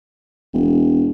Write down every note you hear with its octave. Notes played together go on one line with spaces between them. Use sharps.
E1